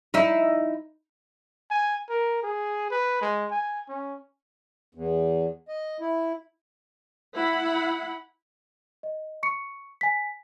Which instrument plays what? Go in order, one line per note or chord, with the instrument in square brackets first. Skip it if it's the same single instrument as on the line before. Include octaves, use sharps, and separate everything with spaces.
[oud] D#4 E4
[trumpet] G#5
A#4
G#4
B4
G#3
G#5
C#4
[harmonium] E2
D#5
E4
[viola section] E4 F#5 B5
[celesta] D#5
C#6 C#7
G#5 B6